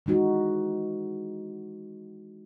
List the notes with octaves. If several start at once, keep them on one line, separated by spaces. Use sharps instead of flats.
E3 G#3 D#4 F#4